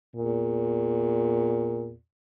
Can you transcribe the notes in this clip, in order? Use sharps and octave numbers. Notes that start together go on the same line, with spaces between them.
E2 A#2